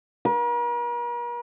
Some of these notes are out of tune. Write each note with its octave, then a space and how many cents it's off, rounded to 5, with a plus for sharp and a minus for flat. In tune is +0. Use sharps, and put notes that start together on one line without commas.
A#4 +45